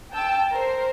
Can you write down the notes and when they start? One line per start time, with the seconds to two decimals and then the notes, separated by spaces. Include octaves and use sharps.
0.12 G5 A5 E6
0.50 A#4 C5